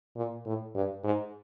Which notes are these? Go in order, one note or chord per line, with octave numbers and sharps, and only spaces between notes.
A#2
A2
G2
G#2